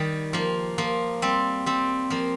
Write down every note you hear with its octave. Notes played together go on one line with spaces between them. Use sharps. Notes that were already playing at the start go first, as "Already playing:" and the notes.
Already playing: D#3 G3
F3 A#3
F3 A#3
G3 C4
G3 C4
F3 A#3